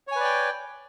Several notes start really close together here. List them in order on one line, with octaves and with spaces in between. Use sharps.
C#5 G#5 B4 D5 G5